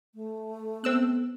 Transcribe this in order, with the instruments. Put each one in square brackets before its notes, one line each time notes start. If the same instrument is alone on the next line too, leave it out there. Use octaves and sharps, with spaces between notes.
[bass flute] A3
[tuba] B3 [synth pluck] C4 E6 F#6